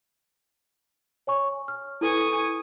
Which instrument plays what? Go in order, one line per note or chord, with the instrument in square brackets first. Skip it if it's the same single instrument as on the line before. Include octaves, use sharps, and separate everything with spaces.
[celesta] C#5 G#5 C#6
F6
[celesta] E4 A4 B4 [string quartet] G#5 C#6 D#6